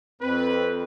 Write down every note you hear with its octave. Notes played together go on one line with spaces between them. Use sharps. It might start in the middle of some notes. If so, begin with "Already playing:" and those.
F2 C4 B4